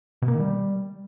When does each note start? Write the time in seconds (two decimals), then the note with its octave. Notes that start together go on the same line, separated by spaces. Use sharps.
0.22 B2
0.28 A#3
0.34 D#3
0.40 G3